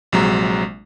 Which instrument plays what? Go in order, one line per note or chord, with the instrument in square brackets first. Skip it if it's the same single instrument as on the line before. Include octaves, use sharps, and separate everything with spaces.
[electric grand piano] A#1 C3 F#3 G#3 A#5